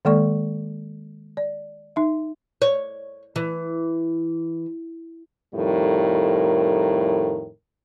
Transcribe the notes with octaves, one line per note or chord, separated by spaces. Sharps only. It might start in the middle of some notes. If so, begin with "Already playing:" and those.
D#3 G#3 A#3 A4 D5 C#6
D5
D#4 E5
C#5
E3
F2 A2 D#3 G3 A#4